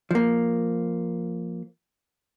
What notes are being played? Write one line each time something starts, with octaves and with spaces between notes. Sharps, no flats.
F3 A#3